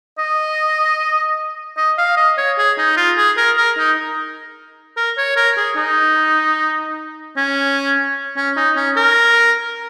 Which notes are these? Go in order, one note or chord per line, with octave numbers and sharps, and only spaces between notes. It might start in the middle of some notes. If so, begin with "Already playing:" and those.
D#5
D#5
F5
D#5
C#5
G#4
D#4
F4
G#4
A#4
A#4
D#4
A#4
C#5
A#4
G#4
D#4
C#4
C#4
D#4
C#4
A#4